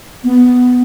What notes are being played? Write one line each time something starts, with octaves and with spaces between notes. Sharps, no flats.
B3